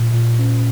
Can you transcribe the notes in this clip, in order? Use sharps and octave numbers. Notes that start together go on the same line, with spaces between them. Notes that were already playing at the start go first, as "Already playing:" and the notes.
Already playing: A#2
A#2
C#4